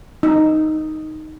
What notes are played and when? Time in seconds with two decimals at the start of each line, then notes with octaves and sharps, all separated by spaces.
0.23 D#4